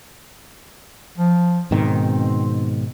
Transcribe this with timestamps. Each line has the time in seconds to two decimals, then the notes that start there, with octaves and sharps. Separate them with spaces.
1.17 F3
1.71 G#2 B2 D#3 C4